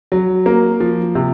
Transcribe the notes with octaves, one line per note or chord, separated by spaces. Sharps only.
F#3
A#3
F3
C3